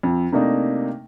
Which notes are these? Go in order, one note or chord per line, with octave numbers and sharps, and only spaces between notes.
F2
C3 A3 A#3 D4 D#4